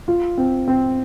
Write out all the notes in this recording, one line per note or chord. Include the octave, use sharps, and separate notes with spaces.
F4
C4
C4